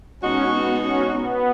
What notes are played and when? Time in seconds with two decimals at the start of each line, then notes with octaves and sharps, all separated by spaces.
0.23 B2 G#3 C#4 D#4 F#4
0.53 B3
0.82 C#4
1.11 B3